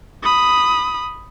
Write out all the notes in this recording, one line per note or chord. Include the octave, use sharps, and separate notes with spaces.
B5 D#6